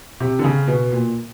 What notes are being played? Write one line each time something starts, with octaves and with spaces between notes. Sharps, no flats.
C3
D3
C#3
B2
A#2